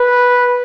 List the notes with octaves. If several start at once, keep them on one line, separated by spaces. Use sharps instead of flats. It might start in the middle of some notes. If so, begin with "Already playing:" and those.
Already playing: B4